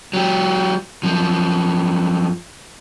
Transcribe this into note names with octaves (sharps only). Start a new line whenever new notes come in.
F#3 G4
F#2 F3